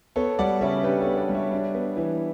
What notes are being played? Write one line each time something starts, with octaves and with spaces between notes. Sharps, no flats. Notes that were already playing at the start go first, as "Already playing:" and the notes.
B3 A4 C#5
G3 D5 F#5
C#3 C#5 E5
D4 G4 B4
A4 C#5
B3
B4 D5
G3
C#5 E5
D4
B3
E3